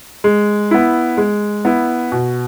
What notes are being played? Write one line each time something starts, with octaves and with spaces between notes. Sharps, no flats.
G#3
B3 E4
G#3
B3 E4
B2